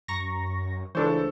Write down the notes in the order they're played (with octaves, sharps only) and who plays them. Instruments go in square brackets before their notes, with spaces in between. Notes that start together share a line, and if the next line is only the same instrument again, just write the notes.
[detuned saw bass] F#2 [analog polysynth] A#5 C#6 A#6
[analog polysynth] C#2 D4 C5 [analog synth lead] E3 [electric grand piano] A3 A4 C#6